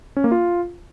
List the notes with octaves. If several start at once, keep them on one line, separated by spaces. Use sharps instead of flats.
C#4
A#3
F4